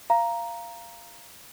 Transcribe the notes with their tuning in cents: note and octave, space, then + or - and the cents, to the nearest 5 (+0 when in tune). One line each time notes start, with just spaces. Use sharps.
F5 -20 A#5 +5